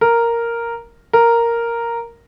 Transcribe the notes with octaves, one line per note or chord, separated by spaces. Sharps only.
A#4
A#4